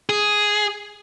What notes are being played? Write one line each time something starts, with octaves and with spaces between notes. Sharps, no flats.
G#4